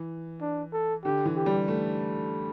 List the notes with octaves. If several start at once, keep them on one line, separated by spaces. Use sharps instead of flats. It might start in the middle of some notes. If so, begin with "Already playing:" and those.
Already playing: E3
D4
A4
D3 G4
E3
G4
G3
A3